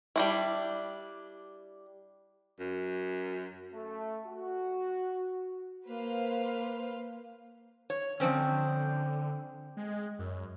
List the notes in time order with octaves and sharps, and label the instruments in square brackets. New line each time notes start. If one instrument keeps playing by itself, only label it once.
[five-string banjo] G3 D4 E4
[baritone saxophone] F#2
[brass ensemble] A3
F#4
[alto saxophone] A#3 [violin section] B4 C5 F5
[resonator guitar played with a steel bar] C#5
[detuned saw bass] D3 [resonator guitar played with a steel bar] F3 C4 C#4
[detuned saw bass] G#3
F#2